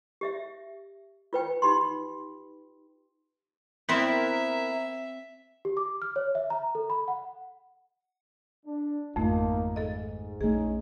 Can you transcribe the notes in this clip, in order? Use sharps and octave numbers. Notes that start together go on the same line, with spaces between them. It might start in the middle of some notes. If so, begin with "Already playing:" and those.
G4 D#5 E5
F4 B4 G5
D#4 G4 B5 C6
B3 C4 E4 A#4 E5 C6
G4
D6
F6
C#5
E5
A#5
A4
B5
F#5
D4
G#1 F2 A3 A#3 D#4 F4
G#2 A4 D#5
A#1 A3 C#4 D#4 G#4